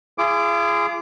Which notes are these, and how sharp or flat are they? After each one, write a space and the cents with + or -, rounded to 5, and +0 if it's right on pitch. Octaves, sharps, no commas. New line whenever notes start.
F4 -45 G#4 +0 D6 +0